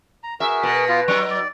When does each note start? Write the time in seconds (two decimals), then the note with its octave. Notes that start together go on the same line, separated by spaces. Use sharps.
0.23 A#5
0.40 F#4 G#4 A#4 E5
0.63 B2
0.89 B3 F4 F5
1.08 F#3 D#4 B4 C#6
1.30 D5